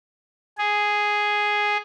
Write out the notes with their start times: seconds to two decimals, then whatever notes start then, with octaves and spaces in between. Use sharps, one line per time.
0.58 G#4